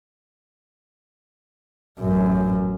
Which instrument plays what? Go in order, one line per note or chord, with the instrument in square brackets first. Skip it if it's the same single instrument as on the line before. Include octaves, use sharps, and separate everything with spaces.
[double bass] A1 F#2